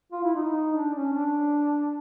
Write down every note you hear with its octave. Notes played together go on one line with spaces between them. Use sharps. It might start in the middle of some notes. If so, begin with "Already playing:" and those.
F4
E4
D#4
D4
C#4
D4